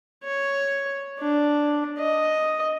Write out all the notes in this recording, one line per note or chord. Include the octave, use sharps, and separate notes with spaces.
C#5
D4
D#5